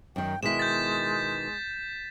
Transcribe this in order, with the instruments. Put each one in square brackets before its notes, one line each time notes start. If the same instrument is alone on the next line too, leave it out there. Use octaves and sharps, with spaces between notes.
[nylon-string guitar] F#2 D#3 [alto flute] G5
[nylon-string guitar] B2 D#3 E4 [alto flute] G#3 [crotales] B6 E7
[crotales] G6 A6